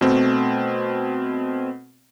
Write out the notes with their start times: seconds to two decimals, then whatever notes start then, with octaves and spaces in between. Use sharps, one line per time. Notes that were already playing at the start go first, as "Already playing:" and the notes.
0.01 B2 A3 C4